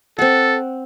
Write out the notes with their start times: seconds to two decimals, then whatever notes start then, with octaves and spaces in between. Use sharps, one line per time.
0.19 C4 A4 F#5